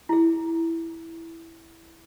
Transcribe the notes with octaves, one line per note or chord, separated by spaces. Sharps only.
E4 G#4